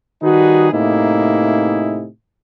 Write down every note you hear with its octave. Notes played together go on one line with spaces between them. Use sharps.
D#3 G3 D#4 F#4 G#4 B4
A2 C3 A#3 D#4 E4 G#4